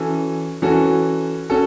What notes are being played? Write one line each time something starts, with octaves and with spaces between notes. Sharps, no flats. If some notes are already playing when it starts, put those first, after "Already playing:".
Already playing: E3 C#4 F#4 A4
E3 C#4 F#4 A4
C#4 F#4 A4